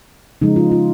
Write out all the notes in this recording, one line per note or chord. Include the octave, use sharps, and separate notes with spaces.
C#3 F3 G#3 D#4
F4
F4